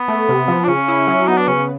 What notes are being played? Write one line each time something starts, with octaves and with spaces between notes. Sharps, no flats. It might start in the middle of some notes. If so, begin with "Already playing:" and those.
Already playing: B3
A3
C3
F3
D4
C#3 C#4
E4
F#3
B3 D#4
D4
C#3 C#4